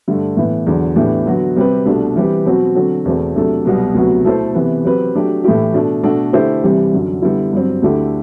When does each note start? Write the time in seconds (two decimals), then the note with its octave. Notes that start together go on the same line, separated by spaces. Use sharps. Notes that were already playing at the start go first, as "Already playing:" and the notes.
0.08 G2 D3 A3
0.37 A2 E3 B3
0.67 E2 D3 F#3
0.96 A2 E3 B3 D4 G4
1.26 D3 F#3 B3 F#4
1.56 C3 G3 C4 G4 B4
1.86 C2 B2 A3 D4
2.16 E3 G3 C4 G4 B4
2.45 B2 F#3 C4 F#4
2.75 D3 F#3 C4 F#4 A4
3.05 E2 B2 A3 C4
3.35 C3 F#3 A3 D4 A4
3.65 C2 B2 F#3 B3
3.94 D2 C3 F#3 B3 F#4
4.25 B2 A3 E4 A4 C5
4.54 C3 E3 B3
4.84 F#3 C4 G4 B4
5.14 F#3 A3 D4 G4
5.44 A2 E3 A3 E4 G4
5.73 B2 A3 D4
6.03 B2 A3 D4 F#4 A4
6.33 D3 A3 E4 G4 C5
6.63 C2 C3 E3 G3 C4
6.93 F#2 D3 F#3
7.22 D3 G3 B3 E4
7.53 G2 F#3 C4
7.82 D2 D3 A3 E4 G4